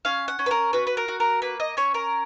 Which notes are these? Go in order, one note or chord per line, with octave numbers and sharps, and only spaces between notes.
C#4 F5
F#5
C#4
B4
A#4
F#4 B4
B4
A#4
F#4
A#4
A#3 B4
D#5
C#4 C#5
A#4